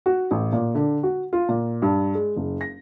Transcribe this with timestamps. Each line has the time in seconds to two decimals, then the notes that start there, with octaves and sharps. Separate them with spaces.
0.06 F#4
0.31 A1
0.53 A#2
0.75 D3
1.03 F#4
1.33 F4
1.49 A#2
1.82 G2
2.15 G#3
2.36 F#1
2.61 A#6